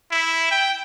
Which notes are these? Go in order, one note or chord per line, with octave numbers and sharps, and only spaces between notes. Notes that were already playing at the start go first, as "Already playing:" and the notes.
E4
G5